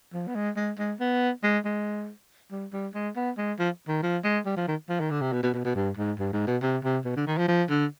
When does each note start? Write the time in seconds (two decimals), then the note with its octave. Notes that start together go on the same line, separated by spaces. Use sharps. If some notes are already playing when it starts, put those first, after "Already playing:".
0.13 F3
0.27 B3
0.35 G#3
0.56 G#3
0.78 G#3
1.00 B3
1.43 G#3
1.65 G#3
2.51 G3
2.73 G3
2.94 G#3
3.16 B3
3.38 G#3
3.59 F3
3.88 D#3
4.03 F3
4.24 G#3
4.45 G3
4.56 F3
4.68 D#3
4.89 F3
5.00 D#3
5.10 D3
5.21 C3
5.32 B2
5.43 B2
5.54 B2
5.65 B2
5.75 G2
5.97 G#2
6.19 G2
6.33 G#2
6.47 B2
6.63 C3
6.84 C3
7.05 B2
7.16 D3
7.27 D#3
7.38 F3
7.48 F3
7.70 D3